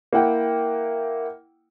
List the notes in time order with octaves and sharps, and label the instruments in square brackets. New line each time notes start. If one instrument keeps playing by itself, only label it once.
[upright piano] A#3 E4 F#5 G5